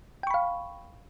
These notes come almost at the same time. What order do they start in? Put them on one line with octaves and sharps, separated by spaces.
G5 C#6 B5 F5